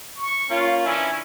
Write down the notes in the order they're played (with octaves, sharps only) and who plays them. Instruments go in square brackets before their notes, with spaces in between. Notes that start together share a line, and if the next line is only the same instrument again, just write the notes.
[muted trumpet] C#6
[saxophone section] A#3 C#4 F4
[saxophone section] E3 D4 E4 [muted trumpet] C#4